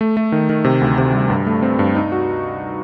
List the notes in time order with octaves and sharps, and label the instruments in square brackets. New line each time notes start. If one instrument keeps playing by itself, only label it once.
[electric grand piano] A3
A3
D#3
D#3
C3
D2
C3
G3
G2
A3
C4
G2
D#4
F#4